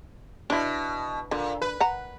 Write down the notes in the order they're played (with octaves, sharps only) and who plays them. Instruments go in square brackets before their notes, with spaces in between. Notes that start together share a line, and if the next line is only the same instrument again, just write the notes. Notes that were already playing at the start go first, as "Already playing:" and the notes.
[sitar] B2 [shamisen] D4 E4
[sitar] A#2 [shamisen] D3
[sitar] B4
[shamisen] F#5 A#5